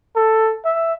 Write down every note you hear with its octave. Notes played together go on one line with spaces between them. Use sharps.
A4
E5